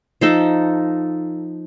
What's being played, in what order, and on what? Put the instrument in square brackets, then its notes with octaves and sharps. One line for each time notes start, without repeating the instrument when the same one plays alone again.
[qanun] F3 D#4 A4